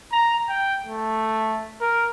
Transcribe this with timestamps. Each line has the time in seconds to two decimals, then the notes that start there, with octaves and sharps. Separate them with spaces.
0.12 A#5
0.49 G5
0.86 A3
1.81 A#4